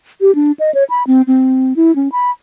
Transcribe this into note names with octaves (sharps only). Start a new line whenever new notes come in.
G4
D4
D#5
C#5
B5
C4
C4
E4
C#4
B5